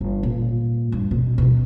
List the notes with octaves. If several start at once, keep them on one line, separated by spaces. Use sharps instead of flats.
G1
A#2
G2
B2
B2 B3